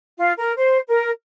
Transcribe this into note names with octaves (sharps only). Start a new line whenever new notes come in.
F4
A#4
C5
A#4